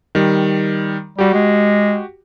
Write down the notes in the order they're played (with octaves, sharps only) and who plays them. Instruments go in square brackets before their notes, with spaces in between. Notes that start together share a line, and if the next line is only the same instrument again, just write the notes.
[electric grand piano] D#3 G3
[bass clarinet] G3 [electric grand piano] F#4 G4
[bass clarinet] G#3